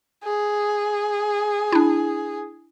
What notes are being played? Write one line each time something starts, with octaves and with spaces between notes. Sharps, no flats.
G#4
D4 E4